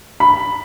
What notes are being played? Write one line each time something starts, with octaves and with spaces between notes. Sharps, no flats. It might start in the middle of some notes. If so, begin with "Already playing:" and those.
B5